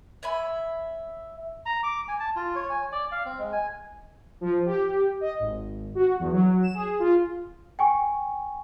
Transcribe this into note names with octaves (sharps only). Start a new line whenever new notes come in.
C#5 E5 G#5 B5
A#5
D6
G#5
A5
F4
C#5
G#5
D5
F5
C4
G#3
G#5
F3
G4
D#5
G#1
F#4
E2
F#3
E7
G#4
F4
G5 G#5 C#6